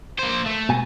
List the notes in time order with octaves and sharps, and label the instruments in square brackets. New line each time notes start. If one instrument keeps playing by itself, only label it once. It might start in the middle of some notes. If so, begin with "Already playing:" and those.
[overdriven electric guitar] A#3 C5
A3
[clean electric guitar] B2 G#5